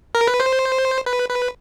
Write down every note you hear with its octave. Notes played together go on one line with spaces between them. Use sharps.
A#4
B4
C5
B4
B4